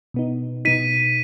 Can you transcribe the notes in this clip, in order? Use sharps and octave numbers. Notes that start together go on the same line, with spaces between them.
B2 B3 D#4
B2 B3 D#4 B6 D#7